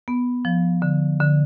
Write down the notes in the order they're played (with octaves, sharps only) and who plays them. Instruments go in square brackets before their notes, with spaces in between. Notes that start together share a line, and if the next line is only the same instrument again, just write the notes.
[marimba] B3
F3
D3
D3